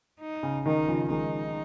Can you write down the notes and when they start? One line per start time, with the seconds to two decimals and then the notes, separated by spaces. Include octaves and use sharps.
0.20 D#4
0.43 C#3
0.66 D#3 D#4
0.88 C#3 F3
1.10 D#3 G#3 D#4